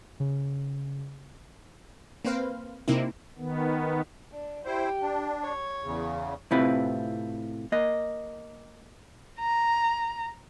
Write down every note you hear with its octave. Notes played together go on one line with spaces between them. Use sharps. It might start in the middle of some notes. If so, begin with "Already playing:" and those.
C#3
A#3 C4 B4 C5 F5
C3 A#3 C4 D#4 E4
D#3 B3
D4
E4 G4 C5
D4
C#5
E2 C#3
A2 C3 C4 E4 F4 B4
A#3 D#5
A#5